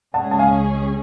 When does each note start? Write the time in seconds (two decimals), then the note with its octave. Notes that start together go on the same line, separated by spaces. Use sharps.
0.14 C#2 C#3 G#3 C#4 G#4 F#5 A5
0.31 A5
0.39 F5 G#5